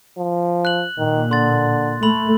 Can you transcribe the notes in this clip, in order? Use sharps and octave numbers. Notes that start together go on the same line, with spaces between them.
F3
F#6 F#7
A#2 D#3
D3 C6 A6
A3 B5 F#7